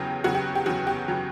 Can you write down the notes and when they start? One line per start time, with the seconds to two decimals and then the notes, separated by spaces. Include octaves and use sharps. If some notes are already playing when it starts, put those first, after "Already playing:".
Already playing: E2 C#3 F#3 G4
0.24 E2 C#3 F#3 F#4
0.35 G4
0.55 G4
0.66 E2 C#3 F#3 F#4
0.87 G4
1.08 C#3 F#3